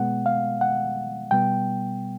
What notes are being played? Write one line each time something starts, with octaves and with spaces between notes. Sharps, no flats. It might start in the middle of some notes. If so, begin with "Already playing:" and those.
Already playing: B2 G#3 B3 F#5
F5
F#5
B2 G3 B3 G5